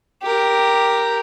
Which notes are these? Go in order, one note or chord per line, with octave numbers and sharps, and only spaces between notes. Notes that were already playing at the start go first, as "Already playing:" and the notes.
G4 A#4